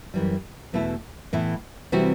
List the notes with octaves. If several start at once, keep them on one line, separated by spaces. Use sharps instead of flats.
F#2 E3 G3
E2 B2 A3 E4
A2 E3 B3 E4
C3 E3 G3 C4 F#4